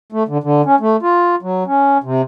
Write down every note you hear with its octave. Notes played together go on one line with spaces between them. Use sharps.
A3
D3
D3
C#4
A3
F4
F#3
C#4
C3